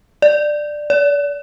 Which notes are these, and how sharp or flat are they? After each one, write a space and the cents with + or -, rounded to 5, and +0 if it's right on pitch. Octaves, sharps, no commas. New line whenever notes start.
D5 +15
D5 -35